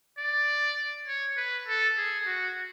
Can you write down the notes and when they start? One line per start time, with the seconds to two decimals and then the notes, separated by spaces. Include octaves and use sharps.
0.19 D5
1.08 C#5
1.37 B4
1.68 A4
1.97 G#4
2.26 F#4